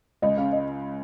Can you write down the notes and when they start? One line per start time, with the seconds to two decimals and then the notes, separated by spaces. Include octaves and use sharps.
0.22 C#2 D#5
0.37 C#3 F5
0.52 D#5